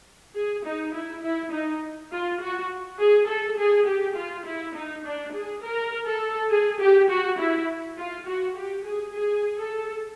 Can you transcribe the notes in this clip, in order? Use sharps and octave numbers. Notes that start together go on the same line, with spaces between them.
G#4
D#4
E4
E4
D#4
F4
F#4
G#4
A4
G#4
G4
F4
E4
D#4
D4
G#4
A#4
A4
G#4
G4
F#4
E4
F4
F#4
G4
G#4
G#4
A4